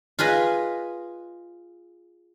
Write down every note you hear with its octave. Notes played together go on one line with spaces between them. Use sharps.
F4 G#4 B4 D#5